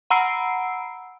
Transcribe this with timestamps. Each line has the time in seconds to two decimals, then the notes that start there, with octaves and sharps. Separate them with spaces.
0.10 F#5 A#5 B5 E6 C7 D7